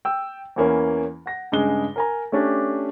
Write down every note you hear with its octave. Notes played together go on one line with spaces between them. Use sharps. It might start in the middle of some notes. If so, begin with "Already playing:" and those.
G5 E6
E2 E3 A#3 C#4
F#5 A#6
G2 C#3 G#3 G#4 G7
A#4 G#5 A#5
A3 C#4 D4 G4